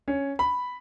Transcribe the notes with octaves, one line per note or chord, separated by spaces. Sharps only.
C#4
B5